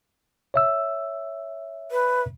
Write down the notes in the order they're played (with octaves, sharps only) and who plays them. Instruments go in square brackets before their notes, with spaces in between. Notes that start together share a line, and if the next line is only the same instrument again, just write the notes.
[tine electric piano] C#5 E5 E6
[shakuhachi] B4